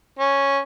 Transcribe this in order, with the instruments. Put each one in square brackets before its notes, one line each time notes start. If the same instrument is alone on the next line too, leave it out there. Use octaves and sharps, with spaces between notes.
[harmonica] C#4